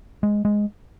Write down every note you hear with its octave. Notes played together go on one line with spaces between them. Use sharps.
G#3
G#3